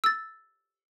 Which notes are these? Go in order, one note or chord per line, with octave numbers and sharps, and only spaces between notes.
E6 A6